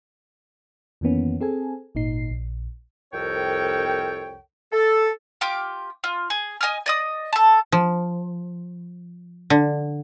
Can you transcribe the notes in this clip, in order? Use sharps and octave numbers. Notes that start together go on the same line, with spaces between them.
F2 D#3 E3 A#3 B3 C#4
C4 G#4 A4 G#5
G#1 A#2 D#4 C7
A#1
C2 F2 A4 A#4 C#5 G5
A4
F4 G4 D6
F4
G#4
D#5 G#5 D#6 F6
D5 D#5 D#6
A4 A5
F3
D3